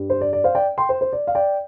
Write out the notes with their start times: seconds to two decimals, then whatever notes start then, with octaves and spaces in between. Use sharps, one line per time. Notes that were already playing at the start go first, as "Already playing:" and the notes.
Already playing: G2 G3
0.10 C5
0.21 D5
0.33 D5
0.44 C5 F5
0.55 D5 G5
0.78 G5 C6
0.89 C5
1.01 C5
1.13 D5
1.27 F5
1.35 D5 G5